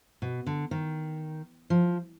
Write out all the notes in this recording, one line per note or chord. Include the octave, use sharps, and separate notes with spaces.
B2
D3
D#3
F3